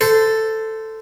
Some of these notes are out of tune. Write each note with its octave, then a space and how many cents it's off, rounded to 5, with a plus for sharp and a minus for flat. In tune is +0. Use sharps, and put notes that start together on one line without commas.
A4 +5 C5 -20